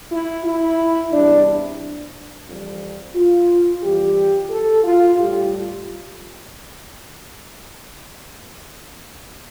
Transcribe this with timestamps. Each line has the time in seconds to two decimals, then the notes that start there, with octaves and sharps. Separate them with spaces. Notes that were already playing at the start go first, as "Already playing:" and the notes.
0.11 E4
0.44 E4
1.12 E2 C3 G3 D4
2.47 F2 E3 G3
3.15 F4
3.82 F2 E3 G3 G4
4.50 A4
4.84 F4
5.17 A2 G3 G4